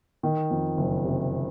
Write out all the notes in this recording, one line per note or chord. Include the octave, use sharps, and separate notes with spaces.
D#3
F2
F#1
C3